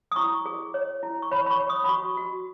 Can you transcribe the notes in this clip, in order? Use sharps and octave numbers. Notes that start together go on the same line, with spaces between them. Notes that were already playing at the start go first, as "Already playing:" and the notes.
D#6
E4 C#6
G#4
C#5
E4
C#6
C#5 B5
B5
C#6
C#5
D#6
B5
F#4 C#6
F#4